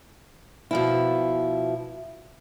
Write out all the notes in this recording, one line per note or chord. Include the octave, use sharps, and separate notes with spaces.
B2 F3 E4